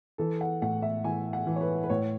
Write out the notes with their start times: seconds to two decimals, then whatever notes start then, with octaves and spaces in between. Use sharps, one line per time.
0.18 E3 A4
0.41 F#5
0.62 A2 F#5
0.82 E5
1.04 E3 G#5
1.33 F#5
1.47 E3
1.56 C#5
1.61 B4
1.84 B4
1.90 A2 C#5